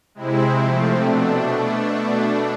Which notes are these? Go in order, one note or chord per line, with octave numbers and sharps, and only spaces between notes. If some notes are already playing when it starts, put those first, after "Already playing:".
C3 G#3 C4 E4
C3 F3 A3 C4
B2 A3 D4